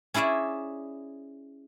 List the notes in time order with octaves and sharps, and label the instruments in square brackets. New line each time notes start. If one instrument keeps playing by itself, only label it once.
[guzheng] C#4 E4 G#4 D5 E5